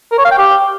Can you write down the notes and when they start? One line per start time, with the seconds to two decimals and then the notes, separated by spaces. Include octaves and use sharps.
0.12 A#4
0.18 C#5
0.25 F5
0.32 G5
0.38 G4